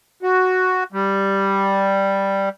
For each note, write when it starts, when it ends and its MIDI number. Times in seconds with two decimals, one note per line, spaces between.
0.23 0.84 66
0.92 2.49 55